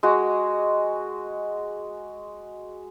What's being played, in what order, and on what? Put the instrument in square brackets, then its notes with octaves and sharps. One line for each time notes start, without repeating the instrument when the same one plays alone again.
[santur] G#3 F#4